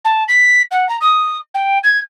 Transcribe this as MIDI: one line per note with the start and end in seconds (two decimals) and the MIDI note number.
0.04 0.23 81
0.28 0.62 95
0.71 0.87 78
0.88 0.97 82
1.00 1.37 87
1.54 1.78 79
1.83 1.99 92